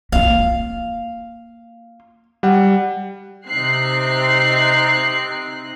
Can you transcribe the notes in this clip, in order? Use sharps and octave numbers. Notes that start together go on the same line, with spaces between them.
A#3 F4 F5
G3 F#5
C3 C4 D#4 F#6 C7